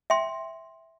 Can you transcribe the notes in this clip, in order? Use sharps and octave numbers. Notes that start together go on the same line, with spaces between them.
E5 G5 C6